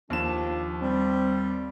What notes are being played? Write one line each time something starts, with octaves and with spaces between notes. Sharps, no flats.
D#2 F3 D4 E7
G3 C4